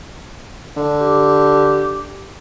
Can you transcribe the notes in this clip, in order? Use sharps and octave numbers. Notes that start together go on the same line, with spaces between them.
D3
G4